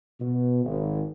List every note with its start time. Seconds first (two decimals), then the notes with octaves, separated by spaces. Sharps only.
0.20 B2
0.65 G#1